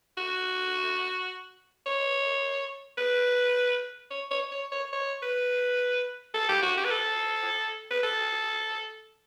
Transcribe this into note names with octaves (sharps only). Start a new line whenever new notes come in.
F#4
C#5
B4
C#5
C#5
C#5
C#5
C#5
B4
A4
G4
F#4
G4
B4
A4
B4
A4